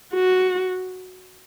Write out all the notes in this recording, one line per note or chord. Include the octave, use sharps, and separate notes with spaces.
F#4